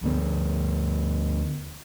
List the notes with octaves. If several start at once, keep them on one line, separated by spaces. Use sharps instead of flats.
D2 B3